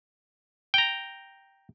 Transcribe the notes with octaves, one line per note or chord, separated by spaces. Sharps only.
G5 A#5